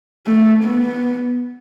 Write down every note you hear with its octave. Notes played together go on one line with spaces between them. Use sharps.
A3
B3